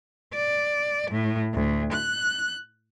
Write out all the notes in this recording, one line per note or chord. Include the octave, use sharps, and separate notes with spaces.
D5
A2
D2
F#6